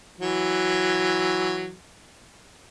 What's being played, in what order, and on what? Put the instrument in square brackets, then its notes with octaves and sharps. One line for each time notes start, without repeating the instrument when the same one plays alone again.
[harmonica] E3 F#3